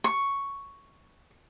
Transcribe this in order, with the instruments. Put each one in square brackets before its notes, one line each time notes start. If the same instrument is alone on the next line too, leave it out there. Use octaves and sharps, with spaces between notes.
[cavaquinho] C#6